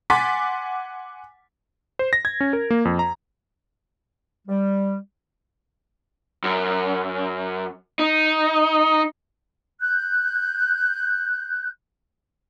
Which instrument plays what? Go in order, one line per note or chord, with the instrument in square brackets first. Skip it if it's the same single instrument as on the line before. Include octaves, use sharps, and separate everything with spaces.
[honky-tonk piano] F#5 G#5 C6 D6 A6 B6
[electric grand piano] C5
A#6
G#6
C#4
A#4
A#3
F2
A#5
[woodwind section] G3
[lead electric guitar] F#2
D#4
[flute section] F#6 G6